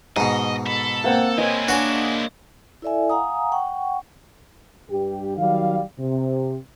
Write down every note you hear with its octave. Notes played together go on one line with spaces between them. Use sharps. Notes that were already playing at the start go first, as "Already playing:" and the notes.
G#2 B2 D#5 A5
A4 B5
A#3 C4 F#5
G#3 C4 E4 C#5 D#5 G#5
D4 F#4 C#5 G#5
E4 A4 D5 E5 G#5
F5 F#5 G#5 A#5 D#6
F#5 G5 C#6
G2 G4
D#3 F#3 G3 F5
C3